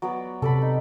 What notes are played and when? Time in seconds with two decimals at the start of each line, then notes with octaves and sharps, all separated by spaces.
0.02 F#3 B3 D5
0.42 C3 A4 D5 B5
0.62 D#4